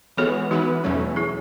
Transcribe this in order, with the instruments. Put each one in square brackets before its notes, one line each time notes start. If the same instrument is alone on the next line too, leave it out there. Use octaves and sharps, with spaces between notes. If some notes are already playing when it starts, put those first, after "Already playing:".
[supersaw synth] E3 G#3 B3 F#4 [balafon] A4 C#5
[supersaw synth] E3 B3 E4 B4 [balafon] D#4 F#4
[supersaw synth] E2 B2 F#3 A3 C#4
[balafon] E4 G#4